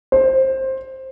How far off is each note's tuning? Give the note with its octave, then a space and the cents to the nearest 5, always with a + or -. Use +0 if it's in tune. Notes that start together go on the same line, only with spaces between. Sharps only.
C5 +15